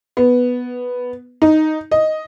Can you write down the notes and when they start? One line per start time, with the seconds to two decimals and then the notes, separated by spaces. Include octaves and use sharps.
0.17 B3
1.42 D#4
1.91 D#5